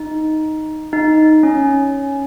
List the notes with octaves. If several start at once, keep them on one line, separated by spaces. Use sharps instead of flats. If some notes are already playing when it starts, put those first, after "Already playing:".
Already playing: D#4
D#4
C#4